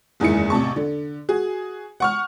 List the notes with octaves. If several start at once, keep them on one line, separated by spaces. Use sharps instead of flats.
F#1 E2 G#2 D#3 E4 C#7
A1 C3 A5 C#6
D3
F#4 G#4
F#5 C#6 F6